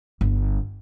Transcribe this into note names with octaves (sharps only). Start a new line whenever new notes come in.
G1